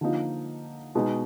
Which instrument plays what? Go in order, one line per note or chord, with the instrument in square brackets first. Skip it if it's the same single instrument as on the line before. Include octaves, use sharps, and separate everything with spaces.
[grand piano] D3 F3 A#3 D#4
B2 G#3 B3 D#4